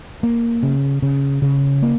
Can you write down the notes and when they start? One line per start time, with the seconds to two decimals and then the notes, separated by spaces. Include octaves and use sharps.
0.23 A#3
0.63 C#3
1.02 C#3
1.42 C#3
1.82 A#3